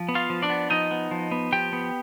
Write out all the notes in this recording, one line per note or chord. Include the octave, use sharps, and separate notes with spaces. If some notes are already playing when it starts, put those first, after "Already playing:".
Already playing: F3
B3
F4 F5
F3
D4 D5
B3
F3 D#4 D#5
B3
F3
B3
F3 G4 G5
B3